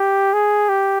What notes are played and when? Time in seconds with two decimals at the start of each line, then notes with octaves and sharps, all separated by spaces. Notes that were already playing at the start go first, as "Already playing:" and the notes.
Already playing: G4
0.33 G#4
0.69 G4